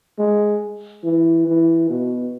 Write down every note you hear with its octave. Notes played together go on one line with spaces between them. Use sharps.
G#3
E3
E3
B2